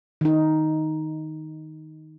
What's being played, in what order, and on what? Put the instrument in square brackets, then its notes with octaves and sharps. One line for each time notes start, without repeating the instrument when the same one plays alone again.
[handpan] D#3 D#4